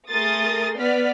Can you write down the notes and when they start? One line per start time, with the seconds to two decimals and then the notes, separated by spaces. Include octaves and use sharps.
0.10 A3 G#4 A#4 C6 D#6 A6
0.77 B3 D5 F6 B6